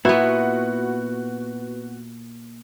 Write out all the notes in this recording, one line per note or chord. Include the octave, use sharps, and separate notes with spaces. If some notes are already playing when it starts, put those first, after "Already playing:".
A#2 B3 E4 F#4 B4